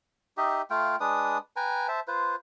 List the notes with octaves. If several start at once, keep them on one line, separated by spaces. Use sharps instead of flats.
D#4 G4 D#5 E5
A3 F4 F5 G5
G#3 D4 B4 D#6
B4 G5 G#5 A#5
C5 E5 A5
F4 B4 C5